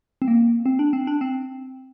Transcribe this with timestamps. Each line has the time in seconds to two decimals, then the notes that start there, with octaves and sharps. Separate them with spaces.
0.22 C4
0.28 A#3
0.66 C4
0.79 D4
0.93 C4
1.07 D4
1.21 C4